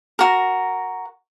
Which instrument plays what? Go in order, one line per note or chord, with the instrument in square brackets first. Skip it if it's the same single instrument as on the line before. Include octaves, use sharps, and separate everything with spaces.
[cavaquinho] F#4 A#4